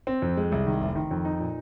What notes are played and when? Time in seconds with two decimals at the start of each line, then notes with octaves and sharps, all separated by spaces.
0.07 C4
0.22 F2
0.37 G#3
0.52 C2
0.67 D#3
0.81 F1
0.95 D#3
1.11 F2
1.25 D#4
1.40 A#2